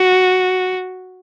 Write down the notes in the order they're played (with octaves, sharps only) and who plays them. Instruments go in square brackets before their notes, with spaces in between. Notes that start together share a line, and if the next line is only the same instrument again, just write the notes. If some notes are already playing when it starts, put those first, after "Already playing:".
Already playing: [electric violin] F#4